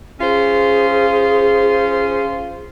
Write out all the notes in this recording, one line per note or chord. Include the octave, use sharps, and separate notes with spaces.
C#4 F4 G#4 C5